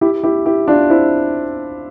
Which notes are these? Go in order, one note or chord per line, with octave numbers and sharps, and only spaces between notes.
E4 G4
E4 G4
E4 G4
D4 F4
C4 E4